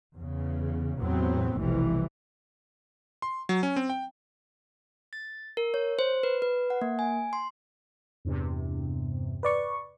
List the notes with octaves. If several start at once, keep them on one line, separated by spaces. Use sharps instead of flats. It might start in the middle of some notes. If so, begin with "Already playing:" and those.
E2 C#3
E2 A2 C3 F#3 B3 C4
F1 B1 F2 C3 E3 G3
C6
F#3
C#4
C4
G5
A6
A#4
C#5
C5
B4
B4
F#5
A#3
G#5
C6
E2 G2 C3
B4 D5 C#6